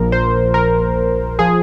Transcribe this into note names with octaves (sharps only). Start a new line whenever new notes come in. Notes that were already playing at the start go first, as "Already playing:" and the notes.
Already playing: A#1 A#2 F3 A#4
C5
A#4
F3 G#4